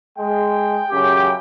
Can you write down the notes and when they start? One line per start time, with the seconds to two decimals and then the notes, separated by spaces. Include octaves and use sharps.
0.18 G#3 G5
0.90 F#2 C#3 G4